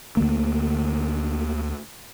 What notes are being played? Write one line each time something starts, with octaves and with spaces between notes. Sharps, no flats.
D2 D3 A3 A#3